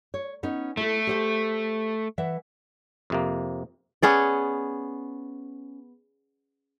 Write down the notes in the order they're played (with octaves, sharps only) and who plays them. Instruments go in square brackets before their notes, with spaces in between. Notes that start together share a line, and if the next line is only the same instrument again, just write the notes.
[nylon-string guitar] C#5
B3 C#4 D#4
[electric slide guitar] A3 [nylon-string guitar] E4 A4
[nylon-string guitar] G4 C5 E5
E3 E5 F#5
[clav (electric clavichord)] F2 C3 A#3
[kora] B3 C#4 G#4 D5